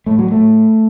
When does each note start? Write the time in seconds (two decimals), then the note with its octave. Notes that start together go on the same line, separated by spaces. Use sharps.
0.06 A2 A3
0.19 F#3
0.31 A3
0.37 A2